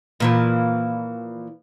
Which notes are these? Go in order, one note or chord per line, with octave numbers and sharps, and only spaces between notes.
A#2 E3 F3